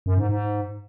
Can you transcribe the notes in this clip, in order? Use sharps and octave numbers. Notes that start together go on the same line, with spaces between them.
F#2
G#2
G#2